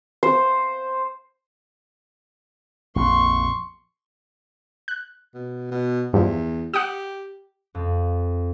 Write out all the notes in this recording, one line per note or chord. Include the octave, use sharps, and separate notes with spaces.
C5
A#1 F2 C6 C#6
F#6
B2
B2
E2 G2 F3
G4 F#5 D#6
F2